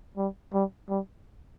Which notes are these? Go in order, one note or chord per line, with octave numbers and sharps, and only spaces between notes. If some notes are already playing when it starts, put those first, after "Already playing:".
G3
G3
G3